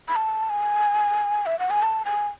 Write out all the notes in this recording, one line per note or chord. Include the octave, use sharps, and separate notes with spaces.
B5
A5
G#5
E5
F#5
G#5
A5
G#5